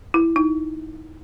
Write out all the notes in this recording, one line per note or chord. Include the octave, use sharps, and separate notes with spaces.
E4
D#4